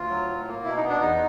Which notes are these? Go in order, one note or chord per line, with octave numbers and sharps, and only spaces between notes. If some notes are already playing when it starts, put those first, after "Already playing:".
Already playing: D2 F4
F#3
A2
A#3
B2 E4
D#4
B3
D4
E2 D#4